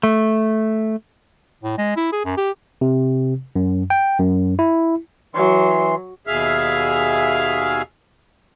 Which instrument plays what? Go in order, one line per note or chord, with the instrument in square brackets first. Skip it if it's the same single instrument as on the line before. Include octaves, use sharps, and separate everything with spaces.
[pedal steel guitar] A3
[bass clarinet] A2
G#3
E4
G#4
F#2
G4
[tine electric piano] C3
F#2
G5
F#2
E4
[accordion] E3 C6 [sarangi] F#3
[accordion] D#2 B2 G#4 E5 F5 F6